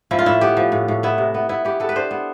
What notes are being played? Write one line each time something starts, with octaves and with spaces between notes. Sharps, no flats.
F3 E4
F4
A2 E4
B3 G4
F3
A2
A2
B3 E4
C3
B3
B3 E4
B3 G4
B3 A4
B4
D4 C5
B3